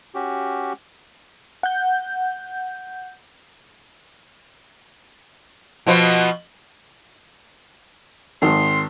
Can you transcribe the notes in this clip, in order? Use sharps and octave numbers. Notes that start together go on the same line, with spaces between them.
C#4 F#4 G4
F#5 G6
B2 F3 B3
G#1 D#3 C6